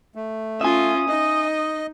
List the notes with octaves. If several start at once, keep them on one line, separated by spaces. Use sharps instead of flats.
A3
C#4 F4 E5 G#5 D#6
D#4 D#5